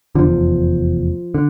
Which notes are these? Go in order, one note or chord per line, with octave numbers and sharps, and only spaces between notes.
F1 E2 D3 F3
D3